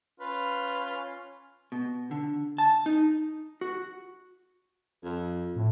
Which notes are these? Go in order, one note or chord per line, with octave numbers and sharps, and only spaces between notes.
C#4 F4 B4
B2
D3
A5
D#4
F#4
F2
A2